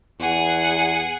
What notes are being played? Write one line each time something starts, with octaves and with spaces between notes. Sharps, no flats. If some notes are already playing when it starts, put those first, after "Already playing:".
E2 G#4 F#5